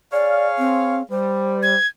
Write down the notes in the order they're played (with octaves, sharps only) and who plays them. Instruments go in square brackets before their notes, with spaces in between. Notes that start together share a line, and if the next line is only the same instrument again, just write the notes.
[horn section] G#4 C#5 F5 [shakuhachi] D5
[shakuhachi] C4
[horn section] G3 [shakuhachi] C5
[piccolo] G#6